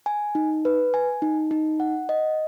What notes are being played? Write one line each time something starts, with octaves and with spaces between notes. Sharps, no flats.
G#5
D#4
B4
G#5
D#4
D#4
F#5
D#5